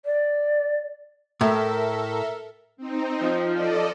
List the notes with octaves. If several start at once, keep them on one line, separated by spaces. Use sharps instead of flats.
D5
A2 A4 A#4 E5
C4 D#4
F3
A4 D5 D#5